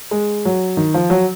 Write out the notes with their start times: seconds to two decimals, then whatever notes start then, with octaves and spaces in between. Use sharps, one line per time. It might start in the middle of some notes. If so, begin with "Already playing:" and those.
0.11 G#3
0.45 F#3
0.77 D#3
0.94 F3
1.10 F#3